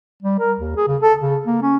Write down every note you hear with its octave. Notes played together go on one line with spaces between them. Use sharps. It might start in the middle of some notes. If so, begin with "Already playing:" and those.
G3
A#4
D#2
G#4
C#3
A4
C#3
A#3
C#4